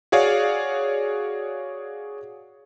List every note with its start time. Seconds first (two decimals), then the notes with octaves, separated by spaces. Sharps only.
0.12 F#4 G#4 C#5 D5 F5